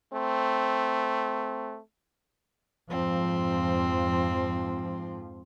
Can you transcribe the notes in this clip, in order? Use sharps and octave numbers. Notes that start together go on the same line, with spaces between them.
A3 C4
F2 G#2 F3 C4